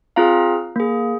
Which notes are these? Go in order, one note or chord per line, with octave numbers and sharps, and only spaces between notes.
C4 F4 G#4 F5 A#5
A#3 G#4